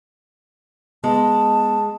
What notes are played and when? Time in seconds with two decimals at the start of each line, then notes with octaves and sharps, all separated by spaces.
1.04 G#3 B3 A5